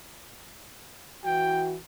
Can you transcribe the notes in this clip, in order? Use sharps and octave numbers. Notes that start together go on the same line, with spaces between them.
E3 F#4 G5